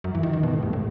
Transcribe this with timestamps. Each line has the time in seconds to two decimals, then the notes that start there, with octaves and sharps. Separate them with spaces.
0.04 F#2
0.15 E3
0.23 D#3
0.33 D#3
0.43 B2
0.53 A2
0.63 G2
0.73 A2